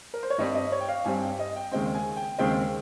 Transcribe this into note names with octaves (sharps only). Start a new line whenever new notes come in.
A#4
C5
C#5
G2 G3 C4 D#5
D#5
C#5
G5
F5
G2 G3 C4 G#5
G5
D#5
G5
D#2 C#3 G#3 C4 G5
G#5
G5
D#2 C#3 G#3 C4 G5